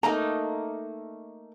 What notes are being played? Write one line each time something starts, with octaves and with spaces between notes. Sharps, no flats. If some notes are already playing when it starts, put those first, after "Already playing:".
A3 A#3 D#4 A#5